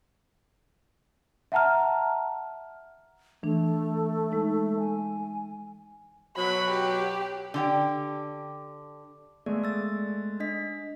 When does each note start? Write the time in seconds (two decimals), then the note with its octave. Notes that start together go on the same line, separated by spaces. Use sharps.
1.52 E5 F#5 A5 A#5 F6
3.43 E3 A3 D4
4.32 G#3 D#4
4.79 G#5
6.37 B2 F#3 B5
6.71 G4
7.54 D3 G4 G5
9.46 G#3 A3 B3 G#4 D5
9.64 E6 A6
10.40 D4 D#5 B6